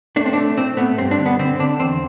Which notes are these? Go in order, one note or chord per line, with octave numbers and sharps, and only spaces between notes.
A3 D4
C4
A3 D4
A2 C4
A3 B3
G2 C4
D4
D3
B3
D3 C4
D3 D4
E2 C4